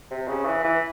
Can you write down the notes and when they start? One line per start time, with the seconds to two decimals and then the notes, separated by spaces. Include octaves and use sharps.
0.11 C3
0.28 C#3
0.45 E3
0.64 E3